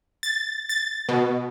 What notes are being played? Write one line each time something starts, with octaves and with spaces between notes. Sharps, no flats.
A6
A6
B2